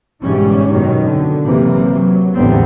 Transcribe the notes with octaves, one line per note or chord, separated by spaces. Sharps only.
G1 G#2 B2 E3 G3 C#4
F#2 B2 D#3
D3
F#1 C3 E3 F#3 A#3
F#3
A1 E2 D3 G3 B3 C4